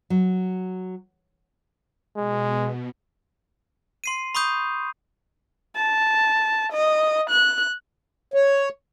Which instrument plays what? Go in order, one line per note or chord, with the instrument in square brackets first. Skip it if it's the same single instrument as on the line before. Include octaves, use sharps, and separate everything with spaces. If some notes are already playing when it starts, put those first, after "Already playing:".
[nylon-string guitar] F#3
[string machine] B2 [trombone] G#3
[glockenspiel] C6 C7 D#7
B5 C#6 D#6 G6
[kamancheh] A5
D#5
F#6
[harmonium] C#5